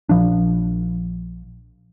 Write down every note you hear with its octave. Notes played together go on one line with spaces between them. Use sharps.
A#1 F3 D4